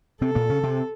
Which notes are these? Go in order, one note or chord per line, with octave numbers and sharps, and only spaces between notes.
C3 C4 A4
A#2 A#3
C#3 C#4
C3 C4